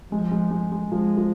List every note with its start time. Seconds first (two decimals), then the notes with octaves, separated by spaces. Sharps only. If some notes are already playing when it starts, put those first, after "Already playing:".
0.12 F3 G#3
0.31 G#3
0.51 G#3
0.72 G#3
0.91 F3 G#3
1.17 F3